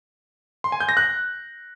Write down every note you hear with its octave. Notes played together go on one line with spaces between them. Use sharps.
C6
G#5
G6
A#6
F#6